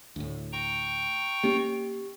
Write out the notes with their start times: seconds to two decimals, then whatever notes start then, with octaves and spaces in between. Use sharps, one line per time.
0.16 D2 A2
0.53 G5 A#5 C#6
1.44 A#3 C#4 G4